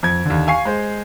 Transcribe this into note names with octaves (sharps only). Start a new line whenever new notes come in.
F2 G#6
D#2 D3
F5 G#5 C#6 C7
G#3 C5